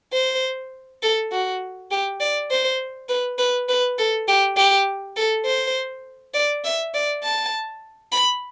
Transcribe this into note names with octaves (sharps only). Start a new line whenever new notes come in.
C5
A4
F#4
G4
D5
C5
B4
B4
B4
A4
G4
G4
A4
C5
D5
E5
D5
A5
B5